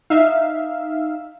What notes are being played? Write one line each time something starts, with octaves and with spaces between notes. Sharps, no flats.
D#4 E5 F5